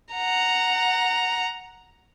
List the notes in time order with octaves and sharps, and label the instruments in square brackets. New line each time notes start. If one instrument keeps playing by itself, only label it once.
[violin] F#5 A#5